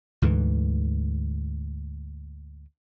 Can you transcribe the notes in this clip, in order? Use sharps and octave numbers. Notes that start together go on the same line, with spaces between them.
D2 G#2 D3 E3